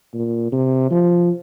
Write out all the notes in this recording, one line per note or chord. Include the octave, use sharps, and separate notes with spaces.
A#2
C3
F3